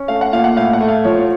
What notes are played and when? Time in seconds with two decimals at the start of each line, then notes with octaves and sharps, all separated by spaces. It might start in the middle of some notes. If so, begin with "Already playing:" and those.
Already playing: C#4
0.08 A3 F5
0.21 F#5
0.32 A#2 F5
0.44 F#5
0.57 A2 F5
0.73 F#5
0.81 A3
0.89 F5
1.05 F3 C#5